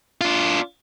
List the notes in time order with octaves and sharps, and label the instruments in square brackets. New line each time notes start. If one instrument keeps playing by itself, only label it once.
[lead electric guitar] D4 F4